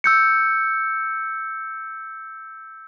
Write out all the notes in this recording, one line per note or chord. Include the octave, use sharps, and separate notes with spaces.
E6 G6 C#7